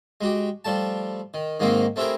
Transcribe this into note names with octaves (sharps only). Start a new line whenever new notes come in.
G#3 F#4 G4
F3 G3 A3 A5
D#3
G#2 D#3 G#3 A#3 C4 D#4
A3 C4 E4 G4 G#4 A#4